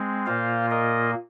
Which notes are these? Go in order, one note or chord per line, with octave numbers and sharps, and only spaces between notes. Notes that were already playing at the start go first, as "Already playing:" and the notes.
Already playing: G#3 C4
A#2 A#3 F4 C5 F5
A#4 D#5